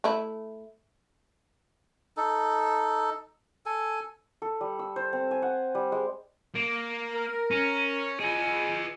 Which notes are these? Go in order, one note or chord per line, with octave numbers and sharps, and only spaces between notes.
A3 E4
D#4 A4
A4 G#5
A4
G3
E6
C5
C4
G#5
F#5
G3
G#3
A#3
A#4
C#4
F4 G#4 B4 D#5 G#5